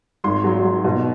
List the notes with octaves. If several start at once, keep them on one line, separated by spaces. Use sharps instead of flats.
G#1 C6
F#3
F#3
B2